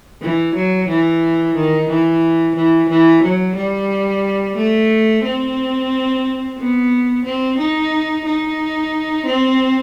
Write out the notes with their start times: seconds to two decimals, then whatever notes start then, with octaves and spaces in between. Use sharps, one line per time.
0.22 E3
0.55 F#3
0.88 E3
1.55 D#3
1.90 E3
2.56 E3
2.90 E3
3.24 F#3
3.56 G3
4.57 A3
5.24 C4
6.58 B3
7.25 C4
7.59 D#4
8.25 D#4
9.26 C4